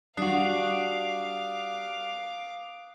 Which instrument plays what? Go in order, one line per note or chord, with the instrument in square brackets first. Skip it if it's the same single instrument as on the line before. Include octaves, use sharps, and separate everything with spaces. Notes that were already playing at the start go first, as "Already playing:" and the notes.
[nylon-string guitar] G3 [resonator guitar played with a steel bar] D4 F#4 [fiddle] F5 D6 [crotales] D#6 F#6 C7